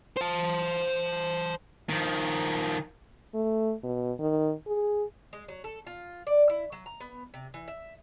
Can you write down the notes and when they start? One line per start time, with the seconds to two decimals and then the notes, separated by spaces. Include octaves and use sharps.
0.17 C5 A5
1.89 D#3 F3
3.34 A3
3.83 B2
4.19 D#3
4.67 G#4
5.33 G#3
5.48 F#3
5.64 A4
5.87 F4
6.27 D5
6.50 E4
6.72 F#3
6.86 A#5
7.00 B3
7.34 C3
7.54 E3
7.68 E5